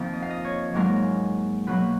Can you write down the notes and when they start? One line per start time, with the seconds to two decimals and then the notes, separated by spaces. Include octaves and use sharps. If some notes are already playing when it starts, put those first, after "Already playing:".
Already playing: F2 D#3 A#3
0.13 D#5
0.22 F5
0.30 D#5
0.45 C#5
0.73 G#2 D#3 F#3 A#3 A#4
1.67 B2 F#3 A#3 B4